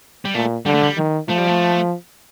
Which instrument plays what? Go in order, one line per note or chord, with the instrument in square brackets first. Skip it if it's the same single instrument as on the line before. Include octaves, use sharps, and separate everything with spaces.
[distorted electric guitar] G3
[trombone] A#2 [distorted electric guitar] A3
[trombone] D3 [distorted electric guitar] G3
[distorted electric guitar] A3
G3
[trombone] D#3
[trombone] F3 [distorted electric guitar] A3
[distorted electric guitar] G3
A3